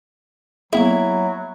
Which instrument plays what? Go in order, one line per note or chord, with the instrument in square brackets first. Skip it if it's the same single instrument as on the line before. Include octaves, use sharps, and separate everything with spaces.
[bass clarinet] F#3 [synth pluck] A#3 B3 G#4 [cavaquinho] E4